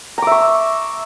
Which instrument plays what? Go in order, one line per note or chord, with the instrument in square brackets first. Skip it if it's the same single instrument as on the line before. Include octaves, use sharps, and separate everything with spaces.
[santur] A#5
D6
E5
C#6